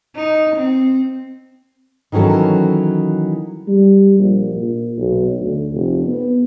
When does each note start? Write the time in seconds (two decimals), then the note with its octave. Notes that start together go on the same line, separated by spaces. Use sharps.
0.16 D#4
0.56 C4
2.12 D#3 E3 F#3 C#4 A4
3.67 G3
4.18 A#1
4.56 A#2
4.98 B1
5.40 D2
5.73 F1
6.06 B3